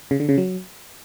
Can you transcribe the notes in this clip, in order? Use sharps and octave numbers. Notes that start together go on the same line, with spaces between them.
C#3
D3
C#3
F#3